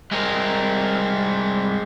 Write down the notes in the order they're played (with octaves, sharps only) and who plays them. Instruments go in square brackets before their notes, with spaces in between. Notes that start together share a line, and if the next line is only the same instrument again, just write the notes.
[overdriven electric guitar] C2 A#4 [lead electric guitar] G#3 C4